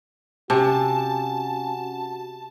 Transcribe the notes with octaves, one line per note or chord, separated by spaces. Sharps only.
C3 C#4 F#4 G#5 A5